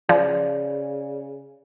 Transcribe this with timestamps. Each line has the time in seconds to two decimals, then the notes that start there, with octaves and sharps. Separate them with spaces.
0.09 C#3 F3 D5